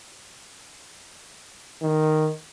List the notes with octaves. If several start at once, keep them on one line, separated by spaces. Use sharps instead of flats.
D#3